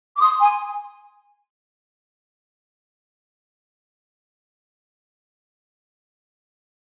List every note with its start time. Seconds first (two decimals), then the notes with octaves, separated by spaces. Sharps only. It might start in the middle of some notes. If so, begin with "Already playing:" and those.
0.15 D6
0.20 C6 D#6
0.40 G#5 C6